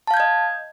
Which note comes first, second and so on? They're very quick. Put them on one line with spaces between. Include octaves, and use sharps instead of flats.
A5 F5 G6 G#6 D#5